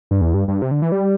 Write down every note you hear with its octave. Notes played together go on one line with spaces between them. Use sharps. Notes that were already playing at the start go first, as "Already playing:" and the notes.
G2
E2
G2
G2
C3
D3
E3
G3